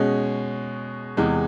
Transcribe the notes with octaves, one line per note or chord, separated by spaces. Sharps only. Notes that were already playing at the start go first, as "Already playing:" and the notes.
Already playing: B2 G#3 C#4
E2 C3 E3 G#3